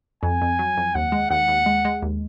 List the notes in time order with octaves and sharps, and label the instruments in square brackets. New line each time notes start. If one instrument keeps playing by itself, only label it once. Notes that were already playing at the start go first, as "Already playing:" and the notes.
[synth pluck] F2 [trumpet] G#5
[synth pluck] F2
F#3
F2
[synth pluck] D#2 [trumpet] F#5
[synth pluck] G#3
[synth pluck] D#2 [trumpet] F#5
[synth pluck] D#2
G#3
G#3
D#2